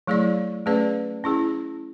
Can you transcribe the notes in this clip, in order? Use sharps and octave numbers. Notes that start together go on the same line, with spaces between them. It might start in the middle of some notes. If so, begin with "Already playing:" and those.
F#3 A3 E4 G#4 D5
A3 C#4 G#4 B4 D5
C#4 E4 G#4